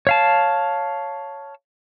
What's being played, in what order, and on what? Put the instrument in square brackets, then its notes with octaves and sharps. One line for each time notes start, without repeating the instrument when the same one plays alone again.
[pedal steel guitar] C#5 F5 A5